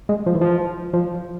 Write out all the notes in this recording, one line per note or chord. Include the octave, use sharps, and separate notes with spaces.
G#3
F3
E3
F3
F3